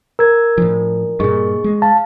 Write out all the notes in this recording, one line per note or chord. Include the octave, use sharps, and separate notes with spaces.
A#4 E6 G#6
A2 F3 D4
G2 A#2 G#4 D#5 C#6
G#3
F5 A5